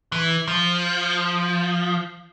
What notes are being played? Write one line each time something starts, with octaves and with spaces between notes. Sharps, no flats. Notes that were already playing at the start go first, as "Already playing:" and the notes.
E3
F3